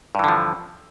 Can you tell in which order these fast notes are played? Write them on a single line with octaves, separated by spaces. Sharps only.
G2 E3 D3 F3